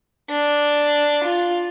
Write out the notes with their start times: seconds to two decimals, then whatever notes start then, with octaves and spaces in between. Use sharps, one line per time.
0.30 D4
1.25 F4